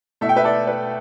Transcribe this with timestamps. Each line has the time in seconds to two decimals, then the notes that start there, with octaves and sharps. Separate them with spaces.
0.21 B2 A3 E4 E5
0.29 G5
0.36 B4 E5
0.44 A4 D5
0.67 B4